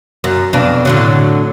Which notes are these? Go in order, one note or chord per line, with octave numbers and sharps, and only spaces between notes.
F#2
F2 B2 D4
A2 D3 F#3